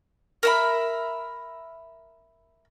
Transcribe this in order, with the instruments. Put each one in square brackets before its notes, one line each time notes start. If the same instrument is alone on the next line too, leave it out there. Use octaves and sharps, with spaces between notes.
[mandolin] A#4 E5 B5